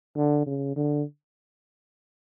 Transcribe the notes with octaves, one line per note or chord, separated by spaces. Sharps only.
D3
C#3
D3